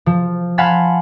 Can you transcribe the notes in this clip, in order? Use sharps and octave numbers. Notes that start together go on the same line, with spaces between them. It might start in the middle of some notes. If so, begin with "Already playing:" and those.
F3
F5 F#5 G#5 A5 B5 C6